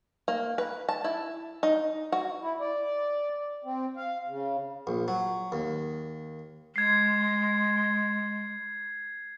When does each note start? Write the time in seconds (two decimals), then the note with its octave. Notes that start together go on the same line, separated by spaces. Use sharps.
0.28 A#3
0.58 B4
0.89 A5
1.04 E4
1.63 D#4
2.12 F#4
2.41 E4
2.60 D5
3.64 C4
3.97 F5
4.28 C#3
4.87 A#1
5.08 F#3
5.52 D#2
6.76 G#3 G#6 C7